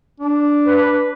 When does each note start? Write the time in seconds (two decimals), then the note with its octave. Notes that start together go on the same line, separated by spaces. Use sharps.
0.20 D4
0.66 B4